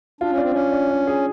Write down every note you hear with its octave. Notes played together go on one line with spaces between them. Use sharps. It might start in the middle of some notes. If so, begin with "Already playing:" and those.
D4 F4
C#4
C4 D4
C#4 D4
D4
D4
G#4